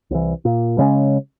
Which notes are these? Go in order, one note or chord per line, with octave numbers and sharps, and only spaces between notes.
C2 E3
A#2
G2 C#3 G#3 C#4